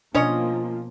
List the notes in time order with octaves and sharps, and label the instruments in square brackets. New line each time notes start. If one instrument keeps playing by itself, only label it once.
[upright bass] B2 [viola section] F3 A#3 F4 [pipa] C#4 C#5 D#5 [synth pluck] D4